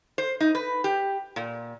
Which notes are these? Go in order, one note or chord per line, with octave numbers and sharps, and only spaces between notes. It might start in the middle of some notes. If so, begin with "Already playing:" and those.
C5
D#4
B4
G4
A#2